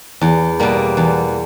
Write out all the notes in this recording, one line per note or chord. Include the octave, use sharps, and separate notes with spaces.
E2
B2 G3 A#3
E2